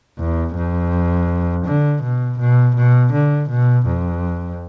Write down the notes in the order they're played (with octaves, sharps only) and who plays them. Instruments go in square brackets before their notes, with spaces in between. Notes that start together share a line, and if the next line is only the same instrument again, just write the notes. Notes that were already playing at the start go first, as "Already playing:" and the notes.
[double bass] E2
F2
D3
B2
B2
B2
D3
B2
F2